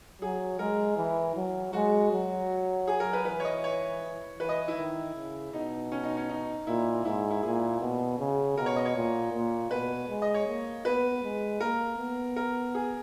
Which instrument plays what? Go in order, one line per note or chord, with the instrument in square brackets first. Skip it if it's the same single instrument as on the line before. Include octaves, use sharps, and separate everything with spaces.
[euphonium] F#3 [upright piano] G#4
[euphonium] G#3 [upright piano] A#4
[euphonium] E3
F#3
[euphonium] G#3 [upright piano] F#4
[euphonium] F#3
[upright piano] G#4
A#4
B4
[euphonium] E3 [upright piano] B4
[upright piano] C#5
D#5
C#5
[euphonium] E3 [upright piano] B4
[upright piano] D#5
E4
[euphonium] D#3
C#3
[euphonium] B2 [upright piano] D#4
[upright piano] C#4
D#4
C#4
D#4
[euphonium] A#2 [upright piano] E4
[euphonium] G#2 [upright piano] E4
[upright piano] E4
[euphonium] A#2 [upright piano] G#4
[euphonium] B2
C#3
[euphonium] B2 [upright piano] A#4
[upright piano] C#5
D#5
C#5
[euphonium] A#2
A#2
[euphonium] B2 [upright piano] B4
[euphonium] G#3
[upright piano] D#5
C#5
[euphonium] A#3
[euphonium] B3 [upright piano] B4
[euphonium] G#3
[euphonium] A#3 [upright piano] A#4
[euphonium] B3
[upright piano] A#4
G#4